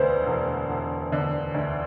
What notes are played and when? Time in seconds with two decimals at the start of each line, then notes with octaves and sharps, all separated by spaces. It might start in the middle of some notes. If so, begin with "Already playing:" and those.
Already playing: E1 D2 D3 B4 C5
0.26 E1
0.69 E1
1.12 D3
1.54 D2